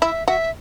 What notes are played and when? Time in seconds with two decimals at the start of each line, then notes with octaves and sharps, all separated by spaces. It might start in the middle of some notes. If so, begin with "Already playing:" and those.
0.01 E4 E5
0.28 F#4 E5